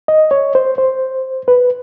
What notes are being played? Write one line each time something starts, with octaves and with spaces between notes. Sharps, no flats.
D#5
C#5
C5
C5
B4